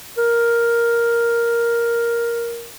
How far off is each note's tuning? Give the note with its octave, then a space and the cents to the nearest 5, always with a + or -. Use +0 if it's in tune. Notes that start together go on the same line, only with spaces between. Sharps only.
A#4 +5